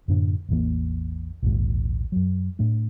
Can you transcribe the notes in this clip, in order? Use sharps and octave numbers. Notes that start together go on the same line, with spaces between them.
F#2 A2 D3 D4
A1 E2 E3 A#3
A#1 D#2 G#2
F#2 F#3
A2 A3 D4